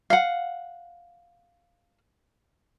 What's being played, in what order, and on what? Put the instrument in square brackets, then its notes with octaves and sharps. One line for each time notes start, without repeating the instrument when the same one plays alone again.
[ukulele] F5 F#5